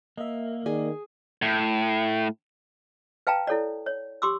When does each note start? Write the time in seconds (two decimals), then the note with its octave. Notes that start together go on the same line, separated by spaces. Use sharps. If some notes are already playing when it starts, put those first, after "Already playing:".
0.18 A#3 D#5 E5
0.66 D#3 G#4 D5
1.42 A2
3.27 B4 F5 G5 A5 A#5
3.47 E4 A4 C#5 D5
3.86 C#5
4.22 G4 C6 D6 E6